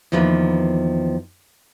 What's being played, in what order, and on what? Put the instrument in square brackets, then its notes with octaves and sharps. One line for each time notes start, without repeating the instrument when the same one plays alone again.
[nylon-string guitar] E2 D#3 F3 A#3 B4